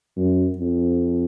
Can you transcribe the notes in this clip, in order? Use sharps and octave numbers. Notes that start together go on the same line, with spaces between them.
F#2
F2